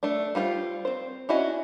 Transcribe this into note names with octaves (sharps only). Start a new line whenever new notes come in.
A3 D4
G3 F4 F#4 C5
C4 C5
C#4 D4 E4 F#4 D#5